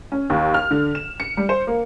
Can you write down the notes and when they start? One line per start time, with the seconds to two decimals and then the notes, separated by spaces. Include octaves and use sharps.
0.12 C#4
0.30 D#2
0.54 F6
0.71 D3
0.95 E7
1.20 C#7
1.37 G3
1.49 C5
1.67 A#3